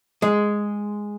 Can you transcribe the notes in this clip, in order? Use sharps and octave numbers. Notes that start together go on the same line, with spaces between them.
G#3